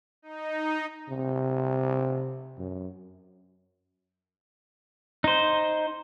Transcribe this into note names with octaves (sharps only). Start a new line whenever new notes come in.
D#4
C3
F#2
D#4 C5